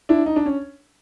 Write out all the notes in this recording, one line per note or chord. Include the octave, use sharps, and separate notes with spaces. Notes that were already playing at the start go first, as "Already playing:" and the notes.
D4 E4
D#4
D4
C#4